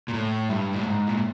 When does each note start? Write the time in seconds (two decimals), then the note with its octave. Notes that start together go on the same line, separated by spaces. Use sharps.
0.08 A#2
0.14 A2
0.49 G2
0.73 A2
0.83 G#2
1.07 A#2